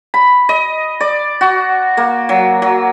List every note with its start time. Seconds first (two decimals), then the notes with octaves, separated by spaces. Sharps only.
0.14 B5
0.49 D#5
1.01 D5
1.41 F#4
1.97 A#3
2.29 F#3
2.62 F#3